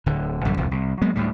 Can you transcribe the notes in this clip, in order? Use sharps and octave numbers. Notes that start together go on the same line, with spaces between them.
D1 D3
A1 F#2 D3 G3
D#1 C2 F2 F3
C2
F#3 G#3 A#3 B3
D2 A2 G3